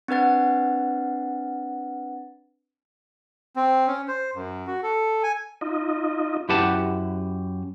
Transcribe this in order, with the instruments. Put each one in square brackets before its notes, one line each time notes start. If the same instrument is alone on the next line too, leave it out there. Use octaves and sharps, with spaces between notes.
[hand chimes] C4 D4 B4 F#5 A6
[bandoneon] C4
C#4
C5
F#2
F#4
A4
G#5
[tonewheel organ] D#4 F4 D#5
[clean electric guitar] F#2 E4 G4 B4 F#5 A5